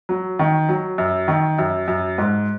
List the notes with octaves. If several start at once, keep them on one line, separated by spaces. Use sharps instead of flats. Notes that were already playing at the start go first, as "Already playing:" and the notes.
F#3
D#3
F#3
F#2
D#3
F#2
F#2
G#2